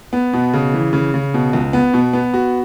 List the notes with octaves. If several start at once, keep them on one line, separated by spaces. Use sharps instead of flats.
B3
B2
C#3
E3
C#3
C#3
B2
C#2
B3
B2
B3
F#4